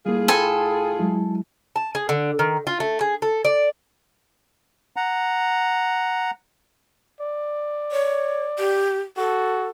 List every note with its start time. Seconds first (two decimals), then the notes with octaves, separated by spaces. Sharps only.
0.06 A2 G3 A#3 F4 G#4
0.28 A4 G5 G#5 B5 C6
0.99 F#3 G#3 E4
1.76 A5
1.95 G#4
2.09 D3
2.39 D#3
2.67 F4
2.80 A3
3.01 G#4
3.22 A4
3.45 D5
4.96 F#5 A#5
7.21 D5
7.92 C#5
8.59 G4
9.17 F#4 A4